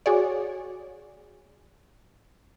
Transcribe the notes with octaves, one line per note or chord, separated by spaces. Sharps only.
F#4 G#4 C#5 D5